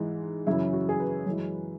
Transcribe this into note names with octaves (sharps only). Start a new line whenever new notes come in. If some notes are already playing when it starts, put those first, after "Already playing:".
Already playing: G#2 E3 G#3
F#2 C#3 E3 E4
F#4
G#4
B4
F#2 E3 G#3